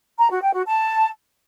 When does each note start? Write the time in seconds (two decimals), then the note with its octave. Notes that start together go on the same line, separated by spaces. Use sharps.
0.19 A#5
0.31 F#4
0.42 G5
0.54 F#4
0.65 A5